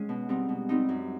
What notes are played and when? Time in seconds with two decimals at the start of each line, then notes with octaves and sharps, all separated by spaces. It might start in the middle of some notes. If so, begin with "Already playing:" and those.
Already playing: G#3 C#4
0.09 B2
0.29 G3 C4 D#4
0.49 B2
0.69 G3 C4 D#4
0.89 F#2